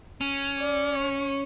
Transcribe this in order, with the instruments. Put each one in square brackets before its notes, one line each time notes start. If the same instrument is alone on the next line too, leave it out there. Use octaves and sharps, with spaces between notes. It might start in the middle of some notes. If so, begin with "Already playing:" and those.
[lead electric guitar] C#4
[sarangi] D5
C#5